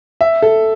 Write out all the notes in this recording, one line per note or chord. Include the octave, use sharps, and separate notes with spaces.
E5
A4